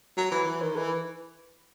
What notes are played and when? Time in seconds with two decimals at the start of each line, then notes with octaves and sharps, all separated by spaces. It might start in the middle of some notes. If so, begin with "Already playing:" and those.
0.17 F#3
0.32 E3
0.47 E3
0.62 D#3
0.76 E3